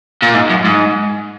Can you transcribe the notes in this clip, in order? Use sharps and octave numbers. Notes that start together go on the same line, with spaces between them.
A#2
G#2
F#2
G#2